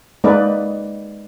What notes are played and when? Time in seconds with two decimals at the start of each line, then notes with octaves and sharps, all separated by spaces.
0.24 G#3 A#3 D#4 B4 D5